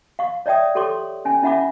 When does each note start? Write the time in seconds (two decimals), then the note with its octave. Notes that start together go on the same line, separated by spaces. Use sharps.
0.19 F5 C#6
0.46 C#5 D5 E5 G5 D#6
0.75 G4 A4 C#5 C6 D6
1.25 C#4 G#5
1.42 C#4 E4 E5 F#5 B5 D6